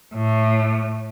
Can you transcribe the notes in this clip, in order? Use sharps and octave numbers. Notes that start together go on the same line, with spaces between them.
A2